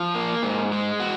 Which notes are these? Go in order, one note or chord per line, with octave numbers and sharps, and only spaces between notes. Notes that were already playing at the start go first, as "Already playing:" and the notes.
Already playing: F3
A#3
G#2
G#3
F#4